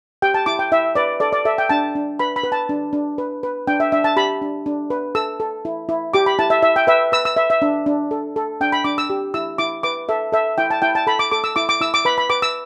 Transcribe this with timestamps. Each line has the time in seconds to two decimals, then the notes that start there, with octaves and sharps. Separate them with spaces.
0.22 G4 G5
0.34 A5
0.46 E4 D6
0.59 G5
0.72 E4 E5
0.95 B4 D5
1.20 A4 D5
1.33 D5
1.45 A4 E5
1.58 G5
1.69 D4 A5
1.95 D4
2.19 B4 B5
2.36 B5
2.43 B4
2.52 A5
2.69 D4
2.93 D4
3.18 B4
3.43 B4
3.67 D4 G5
3.80 E5
3.92 D4 E5
4.04 A5
4.16 G4 B5
4.42 D4
4.66 D4
4.90 B4
5.15 A4 E6
5.40 A4
5.65 E4
5.89 E4
6.13 G4 D6
6.26 B5
6.39 E4 A5
6.50 E5
6.63 E4 E5
6.76 G5
6.87 B4 E5
7.12 B4 E6
7.25 E6
7.37 B4 E5
7.50 E5
7.62 D4
7.86 D4
8.11 A4
8.36 A4
8.61 D4 G5
8.72 B5
8.84 D4 D6
8.98 E6
9.10 G4
9.34 E4 E6
9.58 E4 D6
9.83 B4 D6
10.09 A4 E5
10.32 A4 E5
10.58 E4 G5
10.70 A5
10.82 E4 G5
10.95 A5
11.07 A4 B5
11.19 D6
11.31 A4 D6
11.44 E6
11.56 E4 D6
11.69 D6
11.81 E4 E6
11.94 D6
12.05 B4 B5
12.18 B5
12.30 B4 D6
12.42 E6